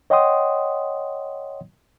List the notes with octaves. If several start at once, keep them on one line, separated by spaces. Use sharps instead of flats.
C#5 D#5 F#5 G5 C6 D#6